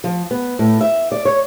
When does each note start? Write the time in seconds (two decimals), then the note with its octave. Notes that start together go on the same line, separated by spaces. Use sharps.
0.04 F3
0.31 B3
0.59 A2
0.81 E5
1.12 D5
1.25 C#5